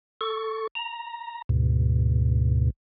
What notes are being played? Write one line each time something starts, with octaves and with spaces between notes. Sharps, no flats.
A4 C#6
A#5
D2 G#2 B2